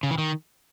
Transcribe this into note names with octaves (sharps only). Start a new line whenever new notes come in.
C#3
E3
D#3